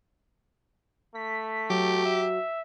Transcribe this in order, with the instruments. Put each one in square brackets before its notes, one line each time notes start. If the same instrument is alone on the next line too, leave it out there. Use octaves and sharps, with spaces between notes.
[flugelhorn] A3 [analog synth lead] B6
[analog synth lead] F#3 [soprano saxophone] G4
[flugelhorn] E5